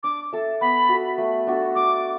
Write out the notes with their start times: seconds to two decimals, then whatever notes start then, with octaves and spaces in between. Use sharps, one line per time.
0.03 D4 D6
0.32 A4 E5
0.61 B3 B5
0.89 F#4 A4
1.18 A3
1.47 D4 F#4 A4
1.75 D4 D6